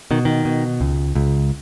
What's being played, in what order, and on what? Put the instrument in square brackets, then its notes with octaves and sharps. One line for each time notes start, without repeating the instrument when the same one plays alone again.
[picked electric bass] B2 D#3
D#3
B2
C#2
C#2